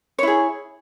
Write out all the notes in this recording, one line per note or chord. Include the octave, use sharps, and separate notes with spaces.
E4 G#4 C#5